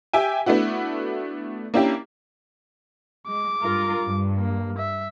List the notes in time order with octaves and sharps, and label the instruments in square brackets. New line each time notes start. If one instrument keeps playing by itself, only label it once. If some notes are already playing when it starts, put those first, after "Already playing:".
[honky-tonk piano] G4 E5 G5 G#5
A3 B3 D4 E4 F#4
A#3 C#4 D4 E4 G4
[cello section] G#3 [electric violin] D6
[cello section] G2 F4 A#4
G2
[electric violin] A#3
E5